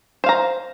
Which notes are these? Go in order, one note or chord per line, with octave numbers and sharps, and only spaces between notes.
C5 F5 A#5